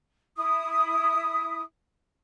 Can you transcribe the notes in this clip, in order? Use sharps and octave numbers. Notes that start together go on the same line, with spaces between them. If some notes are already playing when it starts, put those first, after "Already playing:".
E4 D#6